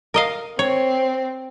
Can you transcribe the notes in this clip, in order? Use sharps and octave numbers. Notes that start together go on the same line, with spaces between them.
A#4 D#5 F5
C4 C#5